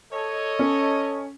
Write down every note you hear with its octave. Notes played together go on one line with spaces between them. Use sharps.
A4 C#5 D#5
C#4